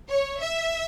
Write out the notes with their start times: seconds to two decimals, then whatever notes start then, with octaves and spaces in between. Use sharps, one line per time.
0.10 C#5
0.41 E5